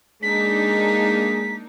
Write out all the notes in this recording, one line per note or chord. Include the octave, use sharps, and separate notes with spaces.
G#3 A#3 D4 D#4 G#4 B6